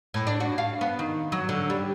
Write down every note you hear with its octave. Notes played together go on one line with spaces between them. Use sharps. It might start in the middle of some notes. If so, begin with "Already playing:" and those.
A2
D4
F#4
F5
B3
D#3
F#3
D3
G3